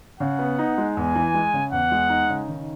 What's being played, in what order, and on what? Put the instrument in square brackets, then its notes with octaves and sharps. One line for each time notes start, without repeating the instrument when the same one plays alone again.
[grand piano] C#3 [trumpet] F#5
[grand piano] B3
D#4
G#3
[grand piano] E2 [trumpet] G#5
[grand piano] E3
G#3
C#3
[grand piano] E2 [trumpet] F#5
[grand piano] G#3
D#4
C#3
D#3